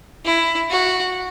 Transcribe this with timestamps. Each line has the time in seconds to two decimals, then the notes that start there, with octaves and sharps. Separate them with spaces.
0.25 E4
0.70 F#4